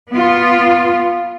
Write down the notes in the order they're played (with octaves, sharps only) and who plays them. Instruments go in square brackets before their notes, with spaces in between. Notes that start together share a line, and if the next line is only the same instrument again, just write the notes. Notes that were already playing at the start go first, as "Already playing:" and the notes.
[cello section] B3 F4